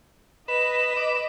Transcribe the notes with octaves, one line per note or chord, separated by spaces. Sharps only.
B4 D#5 E7
B4 D6